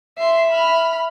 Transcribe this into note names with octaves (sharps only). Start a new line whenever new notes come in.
E5 C6 C7
B5 F6